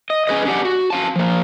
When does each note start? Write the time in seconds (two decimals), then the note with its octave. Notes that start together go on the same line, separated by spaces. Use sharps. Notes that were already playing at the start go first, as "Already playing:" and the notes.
0.10 D#5
0.27 C#4 G#4 B4 D#5
0.45 C#4 D4 G4 F#5
0.65 F#4
0.90 C#4 F5 A5
1.16 F3 A#3